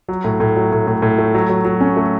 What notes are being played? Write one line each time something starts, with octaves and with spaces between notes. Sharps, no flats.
F#3
A2
A2
F#3
A2
A2
A2
A3
F#3
F#3
F#3
C#4
A3